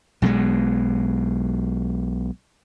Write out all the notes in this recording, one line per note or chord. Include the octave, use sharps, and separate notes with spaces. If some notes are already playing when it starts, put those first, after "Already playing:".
B1 B2 F#3 G#3